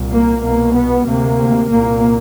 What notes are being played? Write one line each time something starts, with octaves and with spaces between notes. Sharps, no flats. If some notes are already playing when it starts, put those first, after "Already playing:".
Already playing: C2 A#2
A#3
C2 B2 A#3
B3
D2 C3 A#3
C2 A#2 A#3